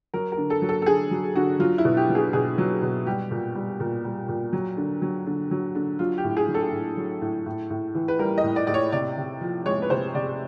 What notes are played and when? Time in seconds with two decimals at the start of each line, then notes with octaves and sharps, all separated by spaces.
0.14 F#3 A#4
0.32 A#4
0.37 D3
0.50 A4
0.62 F#3
0.69 A4
0.82 A4
0.86 D3 G#4
1.11 F#3
1.35 D3 F#4
1.59 F#3 F4
1.78 E4
1.85 B2
1.97 G4
2.09 F#3
2.15 G#4
2.33 B2 G#4
2.58 F#3
2.82 B2
3.06 G3 G4
3.31 A#2
3.55 G3
3.80 A#2
4.04 G3
4.29 A#2
4.53 F#3
4.77 D3
5.02 F#3
5.26 D3
5.51 F#3
5.75 D3
5.99 F#3 F4
6.18 G4
6.24 A2
6.37 G#4
6.48 F#3
6.54 A4
6.72 A2
6.97 F#3
7.22 A2
7.46 A2
7.70 A2
7.95 E3
8.08 B4
8.19 G3 A#4
8.38 D#5
8.44 A2
8.56 D5
8.67 A2 D5
8.74 C#5
8.92 C3 D5
9.17 C3
9.41 F3
9.66 G#3 C#5
9.82 B4
9.90 C3 C5
10.15 C3 D5